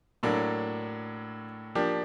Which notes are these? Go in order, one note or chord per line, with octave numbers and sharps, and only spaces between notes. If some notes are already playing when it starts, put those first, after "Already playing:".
A2 F#3 A#3 D4
F3 A#3 D4 G4